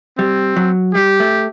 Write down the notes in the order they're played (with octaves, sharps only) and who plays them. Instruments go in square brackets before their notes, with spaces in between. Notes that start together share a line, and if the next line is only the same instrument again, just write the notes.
[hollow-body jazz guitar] G3 [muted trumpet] C4
[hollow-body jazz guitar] F#3
[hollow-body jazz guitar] G3 [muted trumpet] G4
[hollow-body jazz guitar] A3